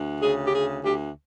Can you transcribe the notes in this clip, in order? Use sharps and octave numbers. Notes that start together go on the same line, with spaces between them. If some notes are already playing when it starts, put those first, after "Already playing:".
Already playing: D2
C#3 G#4
G4
D2 G#4
D2 G4